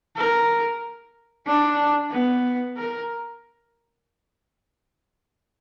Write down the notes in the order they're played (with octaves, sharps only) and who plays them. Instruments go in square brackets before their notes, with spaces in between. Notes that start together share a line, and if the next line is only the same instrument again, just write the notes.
[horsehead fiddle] A#4
D4
B3
A#4